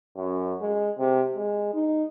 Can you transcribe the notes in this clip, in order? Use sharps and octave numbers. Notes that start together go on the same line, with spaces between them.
F#2
G#3
C3
G#3
D#4